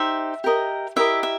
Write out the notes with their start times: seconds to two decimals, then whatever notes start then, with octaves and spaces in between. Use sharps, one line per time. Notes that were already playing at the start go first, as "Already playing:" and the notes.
Already playing: D#4 G4 C5 E5
0.44 G4 A#4 D#5
0.96 E4 G4 A#4 D#5 E5
1.23 E5